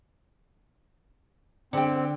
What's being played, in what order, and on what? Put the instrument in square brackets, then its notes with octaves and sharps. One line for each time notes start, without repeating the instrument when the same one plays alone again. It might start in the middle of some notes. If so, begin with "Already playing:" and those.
[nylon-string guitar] D3 G5 [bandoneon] C4